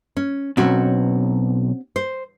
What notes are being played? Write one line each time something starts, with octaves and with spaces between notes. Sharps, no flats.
C#4
B1 C4 C#4 F#4
C5